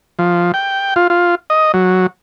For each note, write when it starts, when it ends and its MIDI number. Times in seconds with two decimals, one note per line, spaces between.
0.19 0.52 53
0.54 0.94 79
0.96 1.07 65
1.10 1.35 65
1.50 1.72 75
1.74 2.07 54